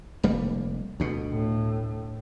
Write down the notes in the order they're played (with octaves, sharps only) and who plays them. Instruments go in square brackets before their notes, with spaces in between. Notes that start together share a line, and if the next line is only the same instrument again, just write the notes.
[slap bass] F1 G3 A#3
D2 B2
[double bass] A2